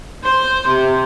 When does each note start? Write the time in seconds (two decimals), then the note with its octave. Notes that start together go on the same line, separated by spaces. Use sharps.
0.24 C5
0.67 C3